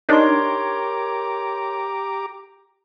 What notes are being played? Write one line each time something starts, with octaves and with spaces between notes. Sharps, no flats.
D4 D#4 G4 A#4 C#5 A#5 C6 D6